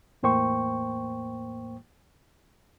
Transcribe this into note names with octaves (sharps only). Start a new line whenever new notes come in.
E2 A2 A#3 C5 G5 C#6